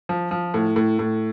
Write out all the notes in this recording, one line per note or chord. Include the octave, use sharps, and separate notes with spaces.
F3
F3
A2
A2
A2